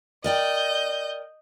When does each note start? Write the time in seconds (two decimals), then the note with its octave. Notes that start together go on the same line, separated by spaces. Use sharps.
0.24 A#4 D5 D#5 G5 G6